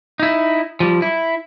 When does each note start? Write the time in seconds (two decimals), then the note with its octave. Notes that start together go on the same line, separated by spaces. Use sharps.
0.20 D#4 E4
0.80 F3 G3
1.02 E4